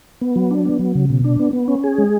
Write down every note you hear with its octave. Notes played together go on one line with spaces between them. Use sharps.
B3
F#3
D4
B3
F#3
C#3
B2
D4
B3
B3
C#4
G#4
G#3